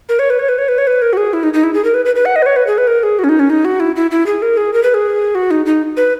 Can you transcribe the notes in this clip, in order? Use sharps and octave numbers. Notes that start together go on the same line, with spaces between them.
A#4
C#5
B4
C#5
B4
C#5
B4
C#5
B4
A#4
F#4
G#4
E4
D#4
D#4
E4
G#4
A#4
B4
B4
B4
F#5
D#5
B4
C#5
B4
G#4
B4
A#4
G#4
F#4
C#4
D#4
C#4
D#4
F#4
E4
E4
E4
G#4
A#4
G#4
A#4
B4
G#4
F#4
D#4
D#4
B4